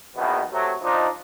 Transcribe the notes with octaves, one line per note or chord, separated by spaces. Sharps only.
A#1 E2 B2 D#3 E3 B3
C3 F#3 A3
F3 D4 D#4